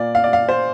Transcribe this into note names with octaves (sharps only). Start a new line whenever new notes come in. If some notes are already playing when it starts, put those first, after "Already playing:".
Already playing: A#2 A#3 F4 D5
F5
D5
F5
C5